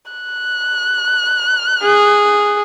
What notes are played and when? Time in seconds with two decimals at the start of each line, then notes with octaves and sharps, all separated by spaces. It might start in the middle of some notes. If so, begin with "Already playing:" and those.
0.12 F#6
1.83 G#4